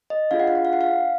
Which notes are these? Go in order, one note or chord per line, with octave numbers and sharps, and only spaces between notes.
D#5
D4 F4 G#4 F5
F#5
F5
F#5
F5
F#5
F5